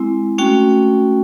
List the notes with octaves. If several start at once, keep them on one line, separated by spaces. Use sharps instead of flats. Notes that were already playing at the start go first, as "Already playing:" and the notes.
Already playing: G#3 C4 E4
A3 C#4 F#4 G5